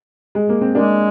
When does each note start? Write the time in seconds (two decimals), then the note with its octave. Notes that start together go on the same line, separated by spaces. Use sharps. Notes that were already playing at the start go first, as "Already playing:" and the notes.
0.35 G#3
0.49 A#3
0.61 C4
0.75 G#3 A#3 D4